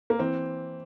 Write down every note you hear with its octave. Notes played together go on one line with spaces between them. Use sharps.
A#3
E3 C4